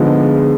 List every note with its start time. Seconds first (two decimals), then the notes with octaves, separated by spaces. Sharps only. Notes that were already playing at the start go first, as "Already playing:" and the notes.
Already playing: D3 F3 G#3 B3 D#4 G#4
0.17 G#4